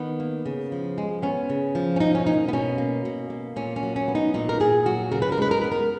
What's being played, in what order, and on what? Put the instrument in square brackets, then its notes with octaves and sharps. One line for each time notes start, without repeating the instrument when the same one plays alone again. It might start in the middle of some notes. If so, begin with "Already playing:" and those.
Already playing: [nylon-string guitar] D#3 B3
A#3
C#3
F3
G#3
B3 C#4
C#3
F3
C#4
B2 D#4
C#4
A#3 D#4
B3
B2 C#4
A#3
B2
A#3
A#2 C#4
C#4
F#3
C#4
B3
D#4
A#2 D#4
A#4
A#2 G#4
F#3 F#4
C#3 A#4
B4
A#4
G#3 B4
A#4
B3 B4
A#4